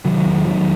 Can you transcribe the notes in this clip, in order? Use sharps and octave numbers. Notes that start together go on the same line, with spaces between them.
C3 D#3 F#3
E2
E2 D#3 F#3